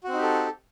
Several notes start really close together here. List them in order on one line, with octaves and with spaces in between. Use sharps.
F#4 C4 D#4 G4 A4